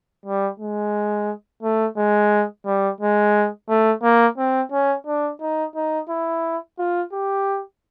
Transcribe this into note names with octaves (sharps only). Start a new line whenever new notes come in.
G3
G#3
A3
G#3
G3
G#3
A3
A#3
C4
C#4
D4
D#4
D#4
E4
F4
G4